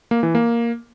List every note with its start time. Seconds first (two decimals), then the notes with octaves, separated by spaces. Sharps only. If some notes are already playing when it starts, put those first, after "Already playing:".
0.11 A#3
0.23 E3
0.35 A#3